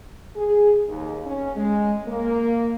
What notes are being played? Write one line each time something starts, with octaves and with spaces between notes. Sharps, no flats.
G#4
D#2
C#4
G#3
A#3